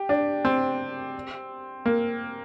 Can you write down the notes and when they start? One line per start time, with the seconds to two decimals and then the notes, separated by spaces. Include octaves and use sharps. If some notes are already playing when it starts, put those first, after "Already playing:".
Already playing: G4
0.09 D4
0.45 C4
1.86 A#3